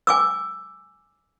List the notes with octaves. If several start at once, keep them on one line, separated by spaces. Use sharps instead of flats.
G#5 D6 E6